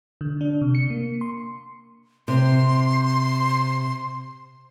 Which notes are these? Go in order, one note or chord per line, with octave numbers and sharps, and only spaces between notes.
D3
D4
C3
C#7
A#3
C6
C3 C6